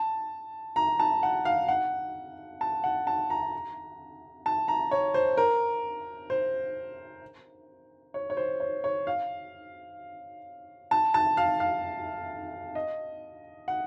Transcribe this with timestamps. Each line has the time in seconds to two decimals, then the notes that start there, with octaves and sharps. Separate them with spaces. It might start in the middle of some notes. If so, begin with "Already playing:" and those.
Already playing: A5
0.76 A#5
1.00 A5
1.23 F#5
1.45 F5
1.68 F#5
2.61 A5
2.84 F#5
3.07 A5
3.30 A#5
4.46 A5
4.68 A#5
4.91 C#5
5.14 C5
5.37 A#4
6.30 C5
8.14 C#5
8.30 C#5
8.37 C5
8.60 C#5
8.84 C#5
9.07 F5
10.91 A5
11.14 A5
11.37 F5
11.60 F5
12.75 D#5
13.68 F#5